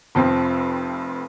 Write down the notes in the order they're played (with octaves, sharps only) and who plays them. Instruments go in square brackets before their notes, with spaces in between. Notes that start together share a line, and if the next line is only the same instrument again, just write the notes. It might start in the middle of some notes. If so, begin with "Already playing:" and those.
[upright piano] F1 F2 F3 C4